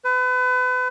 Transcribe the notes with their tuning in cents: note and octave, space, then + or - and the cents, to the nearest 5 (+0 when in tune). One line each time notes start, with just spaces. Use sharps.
B4 +35